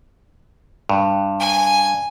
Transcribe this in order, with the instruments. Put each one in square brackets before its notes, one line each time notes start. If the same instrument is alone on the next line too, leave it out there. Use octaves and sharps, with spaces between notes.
[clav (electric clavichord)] G2
[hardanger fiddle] G#5